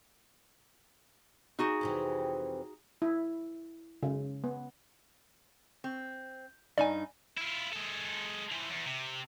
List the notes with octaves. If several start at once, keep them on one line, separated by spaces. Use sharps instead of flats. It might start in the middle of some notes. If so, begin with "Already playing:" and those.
D#4 F#4 G#4
F2 C3 E3
E4
C#3
B3
C4
G2 D#4 D5 G#5
E4 F4
G#3 A4
E3 F3
E2
C3